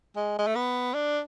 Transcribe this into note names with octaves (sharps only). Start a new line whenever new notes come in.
G#3
G#3
A3
B3
D4